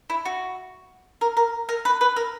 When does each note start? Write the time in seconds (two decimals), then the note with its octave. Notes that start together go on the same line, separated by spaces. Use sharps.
0.10 E4
0.25 F#4
1.21 A#4
1.37 A#4
1.69 A#4
1.85 B4
2.01 B4
2.16 A#4